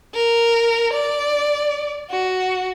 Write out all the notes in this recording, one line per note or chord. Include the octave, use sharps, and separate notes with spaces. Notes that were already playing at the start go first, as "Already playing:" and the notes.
A#4
D5
F#4